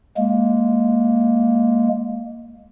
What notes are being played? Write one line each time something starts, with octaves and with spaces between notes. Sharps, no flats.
G#3 A#3